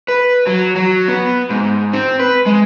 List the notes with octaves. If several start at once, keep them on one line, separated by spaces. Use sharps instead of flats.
B4
F#3
F#3
B3
G#2
C4
B4
G#3